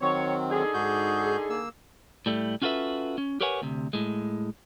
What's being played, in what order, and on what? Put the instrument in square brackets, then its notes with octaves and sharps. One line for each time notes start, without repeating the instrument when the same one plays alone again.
[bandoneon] D#3 F#3 C4 [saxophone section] C#5
[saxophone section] D3 D#4 G#4
[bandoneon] G#2 F#4 G6
A#3 E6
[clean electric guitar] A2 G3 A3
C#4 F4 F#4 A4 B4 E5
C#4
G4 A#4 B4 C#5 F#5 G#5
D2 C3
A2 G#3